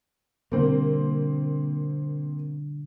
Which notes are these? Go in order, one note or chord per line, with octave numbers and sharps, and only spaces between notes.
B2 D3 G3 A#3 C4